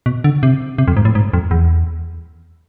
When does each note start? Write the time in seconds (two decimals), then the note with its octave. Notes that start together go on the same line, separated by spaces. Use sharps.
0.06 B2
0.24 D3
0.43 C3
0.78 C3
0.88 F2
0.97 G#2
1.05 A2
1.15 G#2
1.33 F2
1.51 E2